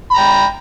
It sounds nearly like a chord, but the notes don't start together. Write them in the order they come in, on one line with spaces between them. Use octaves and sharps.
B5 A#5 G5